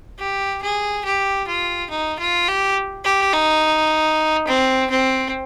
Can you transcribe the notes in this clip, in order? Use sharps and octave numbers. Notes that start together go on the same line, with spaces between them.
G4
G#4
G4
F4
D#4
F4
G4
G4
D#4
C4
C4